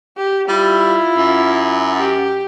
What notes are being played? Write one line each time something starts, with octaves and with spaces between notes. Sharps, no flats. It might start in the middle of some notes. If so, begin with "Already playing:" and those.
G4
G3 E4 F4
F#2
G4